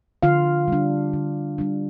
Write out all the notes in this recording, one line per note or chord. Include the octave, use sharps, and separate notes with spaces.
D3 F4 F5
G3 D4
D3
G3 D4